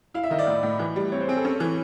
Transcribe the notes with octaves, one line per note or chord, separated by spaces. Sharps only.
E4 F5
E5
D#3 D#5
D5
A2
A2
E3
G3
C4 C#5
C5
C4 G#4
A4
C#4
E3